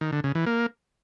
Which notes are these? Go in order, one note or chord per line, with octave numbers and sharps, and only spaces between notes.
D#3
D3
C#3
E3
A#3